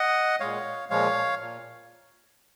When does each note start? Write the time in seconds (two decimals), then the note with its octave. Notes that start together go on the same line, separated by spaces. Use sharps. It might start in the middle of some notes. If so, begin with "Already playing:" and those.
Already playing: D#5 F#5
0.40 A#2 G#3 C#5 F5
0.90 A#2 F3 G#3 C#5 F5
1.40 A#2